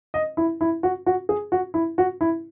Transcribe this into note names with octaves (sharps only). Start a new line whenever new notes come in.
D#5
E4
E4
F#4
F#4
G#4
F#4
E4
F#4
E4